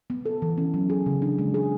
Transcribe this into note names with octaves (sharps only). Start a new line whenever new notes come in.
B3
A4
E3
C#4
F#3
G#4
C#3
D4
G#3
G#4